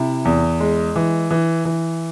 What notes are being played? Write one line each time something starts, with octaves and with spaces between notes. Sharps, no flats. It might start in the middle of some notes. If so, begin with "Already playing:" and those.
Already playing: C3 E4
E2
G#3
E3
E3
E3